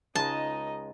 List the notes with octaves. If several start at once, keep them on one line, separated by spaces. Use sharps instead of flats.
C#2 G#3 D#4 D#5 A5